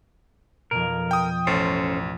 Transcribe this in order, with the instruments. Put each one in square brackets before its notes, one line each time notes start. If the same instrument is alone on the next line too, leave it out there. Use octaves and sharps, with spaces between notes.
[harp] F2 B2 [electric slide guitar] A#4
[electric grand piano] G5 D#6
[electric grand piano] A1 [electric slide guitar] C#4 A4 C5